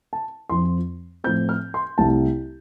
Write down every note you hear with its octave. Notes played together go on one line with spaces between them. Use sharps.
A5
F2 F3 C4 C6
A2 F3 A3 C4 G6
F6
C6
C2 C3 A3 A5